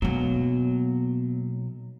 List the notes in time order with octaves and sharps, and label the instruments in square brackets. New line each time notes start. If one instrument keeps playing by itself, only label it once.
[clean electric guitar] B1 E2 F#3 [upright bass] A#3 B3